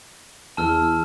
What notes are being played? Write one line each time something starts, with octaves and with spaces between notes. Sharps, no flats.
E2 A5 E6 F6